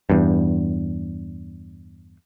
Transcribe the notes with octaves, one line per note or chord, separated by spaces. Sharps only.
E2 G2